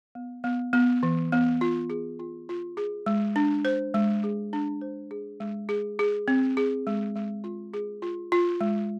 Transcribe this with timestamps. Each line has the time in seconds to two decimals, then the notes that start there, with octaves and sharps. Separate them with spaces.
0.15 B3
0.44 B3
0.73 B3
1.03 E3
1.32 B3
1.61 F4
1.90 G#4
2.19 F4
2.49 F4
2.77 G#4
3.06 G#3
3.36 D4
3.65 C5
3.94 G#3
4.24 G#4
4.53 D4
4.81 C5
5.11 G#4
5.40 G#3
5.69 G#4
5.99 G#4
6.28 C4
6.57 G#4
6.87 G#3
7.15 G#3
7.44 F4
7.74 G#4
8.02 F4
8.32 F4
8.61 G#3